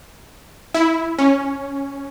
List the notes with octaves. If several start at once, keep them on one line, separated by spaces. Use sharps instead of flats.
E4
C#4